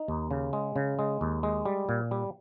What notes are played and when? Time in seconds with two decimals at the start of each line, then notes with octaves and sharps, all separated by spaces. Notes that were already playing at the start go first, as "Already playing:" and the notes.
Already playing: D#4
0.08 D#2
0.31 C#3
0.53 G#3
0.76 C#3
0.99 G#3
1.21 D#2
1.43 G#3
1.65 G3
1.89 A#2
2.11 G3